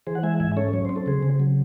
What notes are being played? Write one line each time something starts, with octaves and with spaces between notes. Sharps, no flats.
E3 G#4 C5
F#5
G#3 E5 G#5
G#2 E5 G#5
C#4 A4 C#5
F#3 C#5
C4 C5
A4
C#3 G#4 C5
C#3
F#3